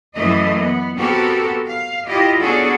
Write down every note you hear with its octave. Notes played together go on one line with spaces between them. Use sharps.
F#2 E3 A3 D#5
B3
B3 C4 F#4 G4 A4 A#4
F5
E4 F4 G4 D#5
B3 C#4 D4 F#4 G#4 A4